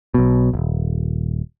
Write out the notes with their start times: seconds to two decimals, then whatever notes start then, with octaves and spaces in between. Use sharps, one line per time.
0.14 B1 B2
0.53 D#1 G#1